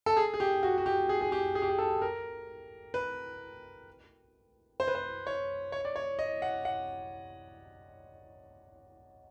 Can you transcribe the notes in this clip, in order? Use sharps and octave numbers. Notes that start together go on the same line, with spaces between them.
A4
G#4
G#4
G4
F#4
F#4
G4
G#4
G#4
G4
G#4
G4
G#4
A4
A#4
B4
C5
B4
C5
C#5
C#5
D5
C#5
D#5
F#5
F#5